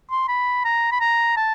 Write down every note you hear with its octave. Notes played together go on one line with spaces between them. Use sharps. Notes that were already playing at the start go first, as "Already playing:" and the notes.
C6
B5
A#5
B5
A#5
A5